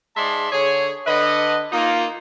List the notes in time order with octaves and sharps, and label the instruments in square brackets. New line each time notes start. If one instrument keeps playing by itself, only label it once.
[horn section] G#2 G#3 D5 E5 A5 C6
D3 G#4 C#5
D3 B4 D#5
A#3 D#4 F4